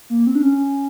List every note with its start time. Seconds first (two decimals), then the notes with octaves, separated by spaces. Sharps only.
0.10 A#3
0.27 C4
0.35 D4
0.43 C#4